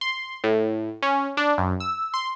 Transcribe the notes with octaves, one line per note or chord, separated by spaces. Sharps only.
C6
A2
C#4
D4
F#2
E6
C6